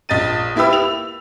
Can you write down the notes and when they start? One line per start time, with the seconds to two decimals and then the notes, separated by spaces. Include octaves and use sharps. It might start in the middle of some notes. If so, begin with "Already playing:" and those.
0.09 A#1 D#5 A6 D#7
0.56 A#3 E4 G4 B4 E6
0.73 F7